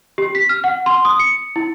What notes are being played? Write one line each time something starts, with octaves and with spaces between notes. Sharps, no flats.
G4
B6
F6
F#5
C6
D#6
C#7
E4